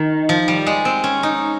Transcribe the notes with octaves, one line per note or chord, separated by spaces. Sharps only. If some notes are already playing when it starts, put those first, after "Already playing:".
Already playing: D#3
F3
G3
G#3
C4
C#4
D#4